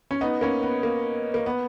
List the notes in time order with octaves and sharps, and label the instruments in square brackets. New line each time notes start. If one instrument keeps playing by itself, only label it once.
[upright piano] C#4
B3 D#4
A#3 C#4
B3
A#3
A#3
B3